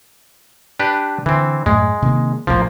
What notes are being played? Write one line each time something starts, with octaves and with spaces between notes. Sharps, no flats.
D4 G4 B4
D3 E3 C4
F#2 A2 G#3
C3 D#3 A#3
A#1 A2 C#3 F3 A#3